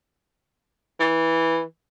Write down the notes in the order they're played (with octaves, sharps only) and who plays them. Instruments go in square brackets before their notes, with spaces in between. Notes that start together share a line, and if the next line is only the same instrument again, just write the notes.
[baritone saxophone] E3